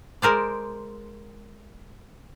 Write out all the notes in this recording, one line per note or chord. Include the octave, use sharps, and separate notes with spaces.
G#3 A#4 C5 D5